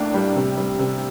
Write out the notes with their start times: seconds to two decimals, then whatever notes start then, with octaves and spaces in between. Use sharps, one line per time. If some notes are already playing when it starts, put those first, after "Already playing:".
Already playing: A2 A#3 D4
0.14 G3
0.36 C3
0.57 G3
0.79 C3